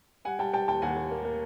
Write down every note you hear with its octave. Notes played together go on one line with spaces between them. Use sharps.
G3 F#5 G#5
G3 G5 A5
G3 G5 A5
D#2 G5 A5
D#2 F#5 G#5
D#2
A#3
A#3